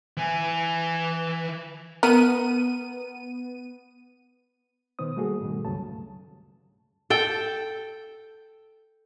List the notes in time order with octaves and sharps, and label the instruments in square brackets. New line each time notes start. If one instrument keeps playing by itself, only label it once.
[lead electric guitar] E3 G#5
[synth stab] B3 D#7 [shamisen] A#4
[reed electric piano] B2 D#3 B3 C5 D#6
G3 A3 A#3 F#4 G#4 A4
G#2 B2 D#3 G3
D2 G2 C#3 F#3 A3 A5
[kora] A4 G5